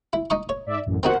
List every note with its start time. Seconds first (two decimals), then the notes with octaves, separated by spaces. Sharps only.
0.13 E4
0.30 D#4 D#5 C#6
0.49 C#5
0.66 G#2 D5 E5
0.86 A1 F#2
1.03 C4 D#4 F#4 A#4 C5 F#5